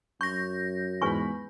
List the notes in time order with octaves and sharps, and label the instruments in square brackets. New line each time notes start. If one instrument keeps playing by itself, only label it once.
[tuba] F#2 [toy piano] C#6 [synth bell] G6 A#6
[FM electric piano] E2 G#2 B5 [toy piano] B4 G#5 C#6